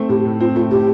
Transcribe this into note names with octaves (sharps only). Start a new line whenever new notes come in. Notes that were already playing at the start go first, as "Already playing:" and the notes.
Already playing: A3 C4
A2 G4
A2
C4 F4
A3 F4
A2 G4